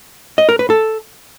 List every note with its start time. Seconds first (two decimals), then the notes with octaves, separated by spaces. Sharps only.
0.38 D#5
0.49 A#4
0.59 B4
0.70 A4